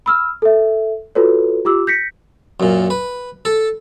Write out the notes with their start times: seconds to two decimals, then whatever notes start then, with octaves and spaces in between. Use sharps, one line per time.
0.06 B5 E6 F6
0.42 A4 E5
1.15 F4 F#4 A4 B4 C#5
1.65 F4 G4 D6 E6
1.87 G6 A#6 B6 C#7
2.60 F#2 A#2
2.90 B4
3.45 A4